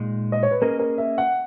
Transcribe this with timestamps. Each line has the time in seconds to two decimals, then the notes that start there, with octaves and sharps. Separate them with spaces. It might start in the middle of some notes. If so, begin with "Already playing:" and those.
Already playing: A#2 G#3 D#4
0.32 D#5
0.43 C#5
0.51 B4
0.62 A#3 C#4 G#4 A#4 D#5
0.79 A#4
0.98 E5
1.18 F#5